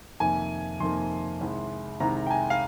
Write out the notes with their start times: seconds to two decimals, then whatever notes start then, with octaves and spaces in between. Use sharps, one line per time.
0.20 F2 C3 D#3 A#3 G#5
0.80 F2 C3 D#3 A#3 C6
1.41 C2 C3 D#3 G#3
2.00 C2 C3 D#3 G#3 A#5
2.26 G5
2.30 G#5
2.50 F5